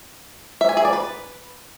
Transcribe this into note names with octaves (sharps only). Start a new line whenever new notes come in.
E5
G#5
G#4
D5
B4